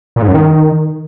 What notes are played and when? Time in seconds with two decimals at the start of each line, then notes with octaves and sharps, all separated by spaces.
0.16 A#2
0.22 G#2
0.28 F#2
0.34 D#3